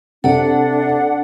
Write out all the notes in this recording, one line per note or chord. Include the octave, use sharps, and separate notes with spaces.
C3 D4 A4 D5 F#5